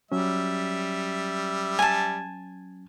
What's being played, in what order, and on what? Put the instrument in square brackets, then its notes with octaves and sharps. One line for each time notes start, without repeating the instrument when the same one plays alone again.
[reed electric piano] F#3 C#4 [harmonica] G3 E5
[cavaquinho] G#5 A5